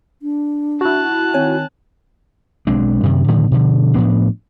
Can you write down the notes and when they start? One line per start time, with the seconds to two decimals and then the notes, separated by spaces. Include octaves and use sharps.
0.22 D4
0.81 E4 F#4 A5 F#6
1.34 D#3 C4 C#5 G#5
2.67 B1 G#3 C4 D4
3.03 F#2 C3 D#3
3.28 A2 D3 D#3 F3
3.51 B2 D3 F3
3.94 A2 F3 B3 D4